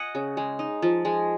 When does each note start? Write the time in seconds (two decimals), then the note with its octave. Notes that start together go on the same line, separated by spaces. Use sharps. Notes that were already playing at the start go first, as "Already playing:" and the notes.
Already playing: D#5 F#5 G#5
0.15 C#3
0.37 G#3
0.59 D#4
0.82 F3
1.05 G#3